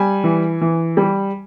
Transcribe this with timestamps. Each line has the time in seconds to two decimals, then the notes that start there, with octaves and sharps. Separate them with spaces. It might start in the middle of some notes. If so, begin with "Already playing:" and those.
Already playing: G3 G#5
0.24 E3
0.61 E3
0.97 G3